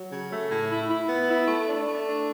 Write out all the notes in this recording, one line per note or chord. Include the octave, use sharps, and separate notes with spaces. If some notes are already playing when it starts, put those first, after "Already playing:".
Already playing: F#3
C#3
A3
A2
E4
E4
B3
E4
A3
D4
A3
D4